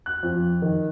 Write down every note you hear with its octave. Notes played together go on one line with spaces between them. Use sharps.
F#6
F2
D#3